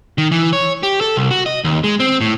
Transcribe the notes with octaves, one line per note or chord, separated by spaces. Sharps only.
D#3
E3
C#5
G4
A4
C2
F#4
D#5
D#2
G#3
C4
A2